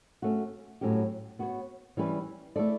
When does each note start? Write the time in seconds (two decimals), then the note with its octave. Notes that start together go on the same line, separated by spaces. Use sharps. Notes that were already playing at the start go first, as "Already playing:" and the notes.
0.22 A3 C#4 F#4
0.81 A2 F#3 C#4 G4
1.39 B3 F#4 C#5
1.97 E3 G3 C#4 E4 B4
2.56 A3 E4 A4 D5